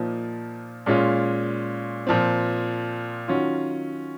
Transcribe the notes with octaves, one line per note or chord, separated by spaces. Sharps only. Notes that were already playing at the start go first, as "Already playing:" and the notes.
Already playing: A#2 F3 A#3 D#4
A#2 G#3 C#4 F4
A#2 F3 C4
D#3 F#3 C#4 F4